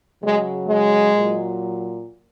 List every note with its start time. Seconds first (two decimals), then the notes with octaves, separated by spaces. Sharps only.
0.20 C#3 F#3 G#3
0.66 G#3
1.12 A#2 F#3